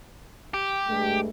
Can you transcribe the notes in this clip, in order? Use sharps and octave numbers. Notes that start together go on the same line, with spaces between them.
G4
G2 G#3 A3